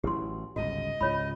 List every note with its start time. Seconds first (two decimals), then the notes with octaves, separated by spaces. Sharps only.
0.04 A1 E3 F#3 G4 C6
0.56 G1 C#2 G#2 F#4 D#5
1.01 C#2 G#2 C3 F4 C#5 B5